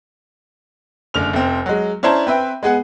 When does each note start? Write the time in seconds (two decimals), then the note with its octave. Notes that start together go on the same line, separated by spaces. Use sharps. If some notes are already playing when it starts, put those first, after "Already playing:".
1.14 F#1 D3 A3 F6 F7
1.33 F1 C4
1.66 F#3 G#3
2.03 C#4 D4 E4 C5 A5 A#5
2.27 C4 B4 E5 G5
2.63 G#3 B3 G#4 F#5